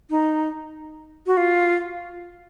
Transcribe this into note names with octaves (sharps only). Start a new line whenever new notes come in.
D#4
F#4
F4